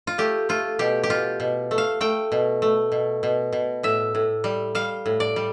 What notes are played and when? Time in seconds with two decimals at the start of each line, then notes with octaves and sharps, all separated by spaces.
0.07 F4
0.18 A3 G4
0.49 A3 F4
0.79 B2 G4
1.03 G4
1.10 B2 F4
1.40 B2
1.71 A3
1.78 F5
2.01 A3 G5
2.32 B2
2.62 A3
2.92 B2
3.23 B2
3.53 B2
3.83 A2 E5
4.15 A2
4.44 G3
4.75 G3 F5
5.06 A2
5.20 D5
5.36 G3